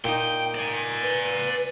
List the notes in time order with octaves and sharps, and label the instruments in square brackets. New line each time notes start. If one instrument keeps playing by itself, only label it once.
[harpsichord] A#2 D#4 [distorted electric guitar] G5
[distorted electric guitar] D5 G#5
[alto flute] B4